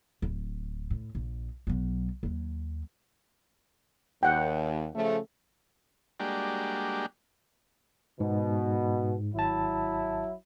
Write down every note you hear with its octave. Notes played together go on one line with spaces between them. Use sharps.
D1
A2
A#1
B1 F#3
D#2 F#3
D#2 F#5 G5
C#3 F3 A3
G3 G#3 A#3 D4 F#4 G4
G#2 B2
G#1 F#3 E4 A5